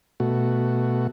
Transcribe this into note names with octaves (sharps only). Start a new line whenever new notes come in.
B2 A3 F#4